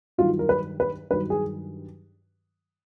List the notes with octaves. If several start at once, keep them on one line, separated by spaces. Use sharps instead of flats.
G2 D#3 F#3 F4
A#4
B4
B4
G2 D#3 F#3 B4
G#4